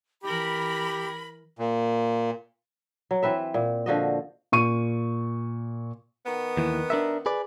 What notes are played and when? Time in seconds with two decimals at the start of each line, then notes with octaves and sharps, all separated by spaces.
0.24 E3 G4 A#4 B5
1.59 A#2
3.11 F#3
3.23 E3 C4 B4 E5
3.54 A#2
3.86 D3 F3 F#4 D#5
4.52 A#2 C#6 D#7
6.26 D#3 B3
6.57 D#2 E3
6.90 D4 A#4 E5
7.26 G#4 B4 D5